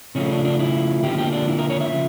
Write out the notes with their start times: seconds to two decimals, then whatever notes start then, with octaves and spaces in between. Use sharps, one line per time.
0.15 C#3 F3 A3 C#4
0.29 D4
0.45 D4
0.59 E4
1.03 D3 F3 A#3 G4
1.18 G4
1.32 D4
1.48 E4
1.58 A#4
1.70 C#5
1.81 E5
1.92 C#3 F3